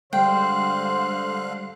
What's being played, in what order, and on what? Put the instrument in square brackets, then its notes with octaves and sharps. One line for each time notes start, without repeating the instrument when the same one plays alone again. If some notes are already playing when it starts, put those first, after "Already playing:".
[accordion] D3 F5 F#6 [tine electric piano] G3 G#3 [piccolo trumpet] C5 [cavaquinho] G5